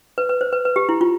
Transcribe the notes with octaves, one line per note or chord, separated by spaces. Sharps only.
B4
B4
C5
B4
B4
G4
E4
F4